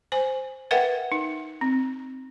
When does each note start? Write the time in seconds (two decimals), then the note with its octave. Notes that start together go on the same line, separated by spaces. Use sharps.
0.12 C5 G#5
0.71 A#4 B4 E5 F#5 G5
1.12 D#4
1.61 C4